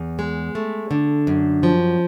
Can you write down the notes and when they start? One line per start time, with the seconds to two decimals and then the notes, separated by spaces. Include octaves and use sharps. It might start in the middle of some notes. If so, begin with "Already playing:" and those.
Already playing: E2
0.19 G#3
0.55 A3
0.91 D3
1.27 F#2
1.63 F3